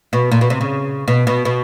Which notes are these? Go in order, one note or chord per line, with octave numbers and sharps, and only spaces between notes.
B2
A#2
B2
C3
C#3
B2
B2
B2